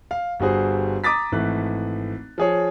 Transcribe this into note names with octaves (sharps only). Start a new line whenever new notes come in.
F5
G1 G3 F#4 G#4 C5
A#5 D6 D#6 A6 B6
G#1 E3 A3 F#6
F3 G#4 C#5